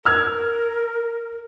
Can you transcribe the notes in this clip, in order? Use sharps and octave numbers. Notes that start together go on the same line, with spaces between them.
A#4 E6 F6 G#6